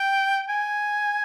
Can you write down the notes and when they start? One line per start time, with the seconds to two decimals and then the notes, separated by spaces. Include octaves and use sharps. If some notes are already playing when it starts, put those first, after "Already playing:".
Already playing: G5
0.49 G#5